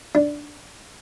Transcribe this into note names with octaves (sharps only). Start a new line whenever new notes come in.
D4